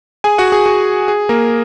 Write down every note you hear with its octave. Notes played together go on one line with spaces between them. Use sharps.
G#4 G#5
F#4 F#5
G#4
F#4
G#4
A#3 A#4